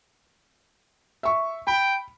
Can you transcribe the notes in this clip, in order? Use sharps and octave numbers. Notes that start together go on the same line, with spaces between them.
E5 C#6
G5 B5